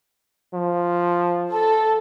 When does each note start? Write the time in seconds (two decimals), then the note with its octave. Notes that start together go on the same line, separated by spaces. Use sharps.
0.54 F3
1.53 A4